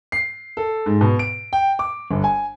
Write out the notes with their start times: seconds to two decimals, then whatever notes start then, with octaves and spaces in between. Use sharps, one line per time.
0.12 C7
0.57 A4
0.86 G#2
1.01 B2
1.19 D7
1.53 G5
1.79 D6
2.11 G1
2.24 G#5